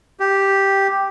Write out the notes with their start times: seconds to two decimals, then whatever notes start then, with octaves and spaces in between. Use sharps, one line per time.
0.20 G4